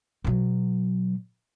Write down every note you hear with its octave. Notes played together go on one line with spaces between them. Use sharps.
B2 F#3